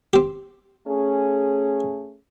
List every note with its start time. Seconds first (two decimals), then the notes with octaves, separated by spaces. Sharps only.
0.13 C4 G4
0.87 A3 C#4 G#4